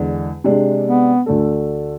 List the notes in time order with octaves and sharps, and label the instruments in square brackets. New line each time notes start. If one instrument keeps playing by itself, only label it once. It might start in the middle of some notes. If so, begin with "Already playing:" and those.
Already playing: [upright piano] E2 D3 G#3
C3 G#3 D4
[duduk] B3
[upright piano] D2 D3 A3 D4 A4